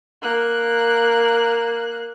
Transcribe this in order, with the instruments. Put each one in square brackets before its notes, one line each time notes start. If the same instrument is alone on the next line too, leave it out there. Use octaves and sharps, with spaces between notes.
[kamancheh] A#3 F#6